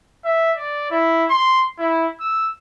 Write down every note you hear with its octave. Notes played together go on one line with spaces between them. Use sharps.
E5
D5
E4
C6
E4
E6